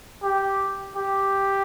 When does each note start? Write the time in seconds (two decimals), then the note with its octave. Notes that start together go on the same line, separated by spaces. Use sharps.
0.23 G4
0.96 G4